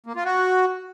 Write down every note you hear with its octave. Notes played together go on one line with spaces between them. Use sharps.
A#3
F4
F#4